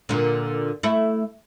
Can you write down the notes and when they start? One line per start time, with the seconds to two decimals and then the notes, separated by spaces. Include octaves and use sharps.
0.09 A#2 D3
0.83 A3 E4